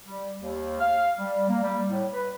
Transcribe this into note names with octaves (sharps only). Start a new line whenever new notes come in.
G3
D#2
F5
G3
A#3
G3
A2
B4